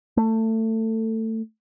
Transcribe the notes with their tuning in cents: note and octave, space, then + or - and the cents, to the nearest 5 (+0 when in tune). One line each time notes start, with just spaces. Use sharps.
A3 +20